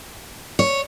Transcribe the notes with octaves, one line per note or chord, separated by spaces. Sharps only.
C#5